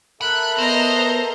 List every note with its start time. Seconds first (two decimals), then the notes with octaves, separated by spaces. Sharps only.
0.21 A4 A#4 E5 B5 F#6
0.58 B3 C5 D#5 A#5